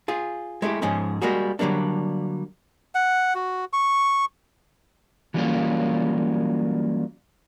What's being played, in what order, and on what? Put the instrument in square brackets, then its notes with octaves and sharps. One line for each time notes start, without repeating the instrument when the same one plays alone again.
[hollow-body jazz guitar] F4 G#4
G#3 A3 E4 G4
G#2 F3 G#3 C#4 G#4
G3 G#3 A#3 F#4 G#4
D3 F#3 G3 A#3 D4
[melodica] F#5
F#4
C#6
[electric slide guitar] E3 F#3 G3 A#3 C#4 F4